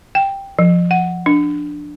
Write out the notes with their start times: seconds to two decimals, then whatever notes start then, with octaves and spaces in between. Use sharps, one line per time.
0.15 G5
0.59 F3
0.91 F#5
1.26 D4